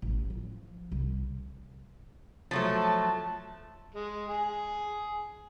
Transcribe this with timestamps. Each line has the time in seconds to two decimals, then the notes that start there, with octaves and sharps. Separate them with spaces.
0.02 A1
0.30 F3
0.92 C2
2.51 F3 F#3 A3 A5
3.94 G#3
4.28 G#4